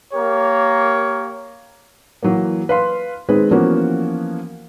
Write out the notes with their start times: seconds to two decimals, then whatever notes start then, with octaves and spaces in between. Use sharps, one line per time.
0.13 A#3 G4 A#4 C#5
2.23 E3 F#3 A#3
2.69 B4 F5 C6
3.29 D#3 G#3 C4 G#4 B4
3.51 E3 F3 A#3 B3 C#4 F#4